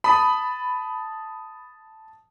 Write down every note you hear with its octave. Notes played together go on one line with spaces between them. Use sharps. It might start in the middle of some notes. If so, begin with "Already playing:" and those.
A5 B5 D#6